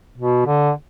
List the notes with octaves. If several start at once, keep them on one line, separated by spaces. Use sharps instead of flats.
B2
D3